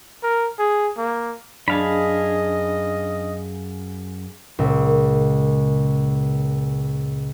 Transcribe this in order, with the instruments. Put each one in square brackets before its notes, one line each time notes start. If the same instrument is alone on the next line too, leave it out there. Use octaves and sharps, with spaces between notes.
[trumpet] A#4
G#4
A#3
[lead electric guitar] F#2 A5 [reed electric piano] D4 [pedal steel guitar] G#4 F5 B5 [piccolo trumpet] D#5
[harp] C#2 A#2